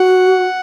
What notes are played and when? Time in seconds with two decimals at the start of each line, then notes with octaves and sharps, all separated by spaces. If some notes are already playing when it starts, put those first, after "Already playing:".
Already playing: F#4 F#5